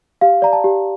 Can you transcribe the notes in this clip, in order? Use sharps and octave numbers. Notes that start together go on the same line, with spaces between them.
G4 F5
D5 A#5
A5
G4